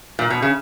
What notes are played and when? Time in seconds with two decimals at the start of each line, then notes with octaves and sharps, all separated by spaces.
0.19 A#2
0.30 B2
0.42 C#3